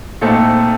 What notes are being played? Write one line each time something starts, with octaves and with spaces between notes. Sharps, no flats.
A#2 A3 C4 D#4 A4